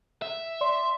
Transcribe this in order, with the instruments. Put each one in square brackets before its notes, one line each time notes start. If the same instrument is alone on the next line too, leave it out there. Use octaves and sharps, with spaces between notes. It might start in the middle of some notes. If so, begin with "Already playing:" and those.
[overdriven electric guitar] E5
[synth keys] D5 C6